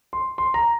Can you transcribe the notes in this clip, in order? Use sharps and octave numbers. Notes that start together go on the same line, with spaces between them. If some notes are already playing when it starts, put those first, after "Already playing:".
C6
C6
A#5